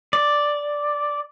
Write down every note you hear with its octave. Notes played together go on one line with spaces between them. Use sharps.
D5